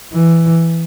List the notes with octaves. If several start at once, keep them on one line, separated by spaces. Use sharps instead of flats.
E3